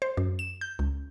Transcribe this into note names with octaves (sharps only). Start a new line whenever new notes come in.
C5
F#2
E7
G6
C#2